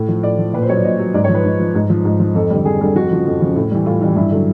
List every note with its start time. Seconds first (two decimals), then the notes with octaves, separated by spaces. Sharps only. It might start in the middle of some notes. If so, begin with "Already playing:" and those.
Already playing: A2
0.09 F3
0.23 A2 D5
0.39 F3
0.53 A#2 B4
0.62 C5
0.69 F#3 C#5
0.76 D5
0.84 A#2 D#5
0.99 F#3
1.14 G#2 D5
1.24 C#5
1.29 F3
1.34 B4
1.45 G#2
1.60 F3
1.75 G#2
1.90 F3
2.05 G#2
2.20 F3
2.35 F2 A4
2.50 D3 G3
2.65 F2 G#4
2.81 D3 G3
2.95 F2 F#4
3.11 C#3 F3
3.26 F2
3.40 C#3 F3
3.56 A2
3.71 E3 G3
3.86 A2 F4
4.01 E3 G3
4.16 G2 E4
4.31 D3 F#3